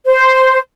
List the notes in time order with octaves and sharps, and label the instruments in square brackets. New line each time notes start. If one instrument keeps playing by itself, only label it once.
[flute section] C5